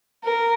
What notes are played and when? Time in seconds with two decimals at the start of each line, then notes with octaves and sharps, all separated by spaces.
0.24 A#4